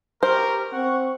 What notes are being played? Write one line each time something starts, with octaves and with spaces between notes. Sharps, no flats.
G4 A#4 C5 C#6 F6
C4 F#5 C#6